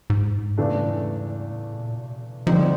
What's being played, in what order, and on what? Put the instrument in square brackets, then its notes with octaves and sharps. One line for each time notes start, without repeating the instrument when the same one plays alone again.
[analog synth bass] G#2
[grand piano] E2 C#3 E3 A3 D4
[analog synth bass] A2
A#2
B2
[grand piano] D2 D3 G3 C4 D#4 [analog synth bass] F3